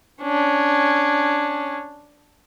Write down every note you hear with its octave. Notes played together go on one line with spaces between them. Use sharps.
C#4 D4